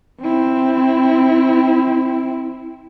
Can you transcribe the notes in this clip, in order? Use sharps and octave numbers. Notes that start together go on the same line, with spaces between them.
C4 E4